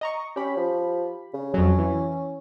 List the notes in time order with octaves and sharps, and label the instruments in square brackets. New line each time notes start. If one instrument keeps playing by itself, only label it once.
[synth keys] D#5 A#5 C#6
[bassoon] C#4 [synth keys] G4 B5
[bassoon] F3
C#3
[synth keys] F2 F#3 [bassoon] C#4
[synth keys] E3